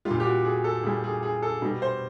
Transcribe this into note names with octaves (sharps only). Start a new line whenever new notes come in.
G3 F4
A#2
G4
F#4
G#4
A4
A#2 G3 G#4
G#4
G#4
A4
B2 G3
C5